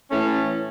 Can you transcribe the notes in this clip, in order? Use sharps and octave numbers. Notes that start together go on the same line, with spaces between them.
A2 E3 A3 C#4